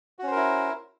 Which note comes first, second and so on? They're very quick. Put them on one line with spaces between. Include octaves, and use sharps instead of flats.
F#4 C#4 C5 A#4 E4